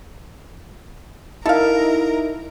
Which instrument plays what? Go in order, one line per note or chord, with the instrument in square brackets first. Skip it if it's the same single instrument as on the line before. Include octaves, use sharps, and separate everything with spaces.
[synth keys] D#4 E4 [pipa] A4 F5 [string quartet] A#4